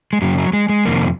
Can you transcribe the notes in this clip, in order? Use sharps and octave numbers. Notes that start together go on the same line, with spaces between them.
G#3
F#2 C#3 F#3
F#3
G#3
G#3
F2 C3 D#3 A#3